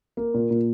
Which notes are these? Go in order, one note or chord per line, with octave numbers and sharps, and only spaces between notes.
A#3
A#2
A#2